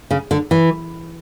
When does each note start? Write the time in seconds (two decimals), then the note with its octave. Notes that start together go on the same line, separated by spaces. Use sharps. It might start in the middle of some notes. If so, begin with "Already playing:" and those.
0.11 C#3
0.31 D3
0.51 E3